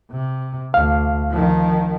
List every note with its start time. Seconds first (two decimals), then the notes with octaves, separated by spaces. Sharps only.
0.11 C3
0.74 D2 F5
1.31 D#3 F3